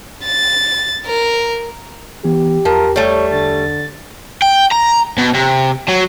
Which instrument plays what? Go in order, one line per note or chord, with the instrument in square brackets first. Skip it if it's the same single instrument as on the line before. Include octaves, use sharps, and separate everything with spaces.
[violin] A6
A#4
[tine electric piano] E3 B3 [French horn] G4
[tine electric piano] E2 [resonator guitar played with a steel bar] F3 [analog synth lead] A#4
[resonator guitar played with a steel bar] G3 A3 [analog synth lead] C#5
[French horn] D3 [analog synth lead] A6
[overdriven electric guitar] G5
A#5
B2
C3
F#3